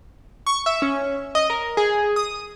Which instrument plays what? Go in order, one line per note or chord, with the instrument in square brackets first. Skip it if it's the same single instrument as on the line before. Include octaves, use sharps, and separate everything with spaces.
[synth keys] C#6
E5
C#4
D#5
A#4
G#4
D#6